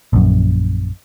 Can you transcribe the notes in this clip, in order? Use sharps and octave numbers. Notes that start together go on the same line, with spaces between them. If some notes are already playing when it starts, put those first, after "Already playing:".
A#1 F#2